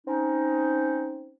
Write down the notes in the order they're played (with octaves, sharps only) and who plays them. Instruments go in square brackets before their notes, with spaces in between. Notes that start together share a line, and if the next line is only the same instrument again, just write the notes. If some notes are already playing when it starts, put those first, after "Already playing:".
[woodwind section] C4 C#4 D#4